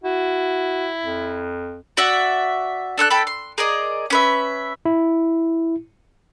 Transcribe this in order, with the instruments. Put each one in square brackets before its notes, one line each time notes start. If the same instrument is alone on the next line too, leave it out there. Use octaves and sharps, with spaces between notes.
[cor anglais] E4 [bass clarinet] F#4
[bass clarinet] F2
[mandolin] F#4 D5 E5 F#5
D4 A4 D#6 F#6
A4 G5 A5 B5
C6
G#4 A#4 D5 D#5
C#4 B4 E5
[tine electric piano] E4